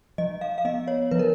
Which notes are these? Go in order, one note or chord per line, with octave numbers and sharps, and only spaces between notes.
F3 D#5
F5
F5
B3 D#5
C#5
F3 B4
A#4